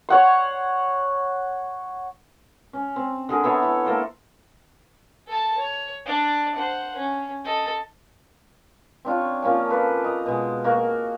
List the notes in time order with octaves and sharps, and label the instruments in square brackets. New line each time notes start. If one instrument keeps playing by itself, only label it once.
[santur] C#5 F#5 C6
[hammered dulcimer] C#4
C4
D3 G#4 A#4
B3 A4 C#5 E5
E4
A#3 A4 C5
[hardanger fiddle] A4 A5
C#5
D4 D5
C5 F#5
C#4
A4 D#5
[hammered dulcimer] C4 D4 F4 C#5
F3 A#3 C#4 A5
A4 B4 C5 D5
D#5 A#5
B2 G#3
A#3 F#4